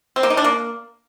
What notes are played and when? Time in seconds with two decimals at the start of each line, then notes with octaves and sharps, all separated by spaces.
0.16 C4
0.23 A#3
0.30 D#4
0.37 D4
0.44 A#3